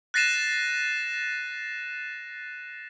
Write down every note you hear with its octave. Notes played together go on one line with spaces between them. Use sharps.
F#6 A6 A#6 C7 D#7 E7